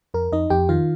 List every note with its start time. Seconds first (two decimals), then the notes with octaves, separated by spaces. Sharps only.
0.14 F2 A#4
0.32 F2 D#4 D#5
0.50 F2 G4 G5
0.69 D#3 F4 F5